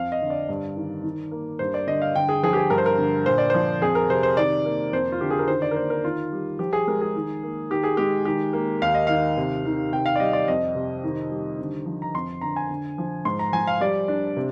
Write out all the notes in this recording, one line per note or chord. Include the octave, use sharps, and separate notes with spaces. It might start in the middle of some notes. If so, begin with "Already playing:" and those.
Already playing: F2 F5
D#5
D3
D5
G2
D#3
D#3
A#3
G2 C5
D5
D3 D#5
F5
D3 G5
G#4
F3 G#4
G4
G#4
G2 A#4
C5
A#4
D3
A#2 C5
D5
F3 C5
F2 G#4
A#4
C3 C5
C5
D#3 D5
A#3
F2 C5
F4
D3 G4
G#4
A#4
D#3 C5
D5
A#4
A#3 C5
A#4
D#3 F4
G3
F3 G4
G#4
G#3 A#4
G#4
D#3
A#3
D#3 G4
G#4
G#3 G4
D#3 G4
A#3
D#2 F5
D#5
D#3 F5
C3
D#3
C3 G5
F5
D5
G3 D#5
D5
F2 D#5
C3
D#3
G3
D3
F3
A#5
F2 C6
D3 A#5
G#5
D3
F3
G#2 C6
A#5
F3 G#5
F5
G3 D5
D4
C3